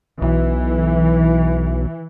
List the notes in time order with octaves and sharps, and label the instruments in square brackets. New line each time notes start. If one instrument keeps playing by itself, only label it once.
[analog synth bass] B1 [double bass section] E3